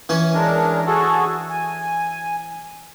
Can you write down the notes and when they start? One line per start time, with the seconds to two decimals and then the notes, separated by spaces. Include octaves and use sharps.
0.09 E3 C#4
0.34 G#3 D4 A#4
0.87 F#4 G#4 A4
1.49 G#5